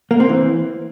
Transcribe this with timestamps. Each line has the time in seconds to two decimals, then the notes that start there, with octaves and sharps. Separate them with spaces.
0.11 A#3
0.20 C4
0.29 E3